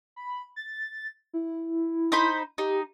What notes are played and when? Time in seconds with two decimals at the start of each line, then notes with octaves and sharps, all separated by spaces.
0.16 B5
0.56 A6
1.33 E4
2.12 D#4 C5 B5
2.58 D#4 G4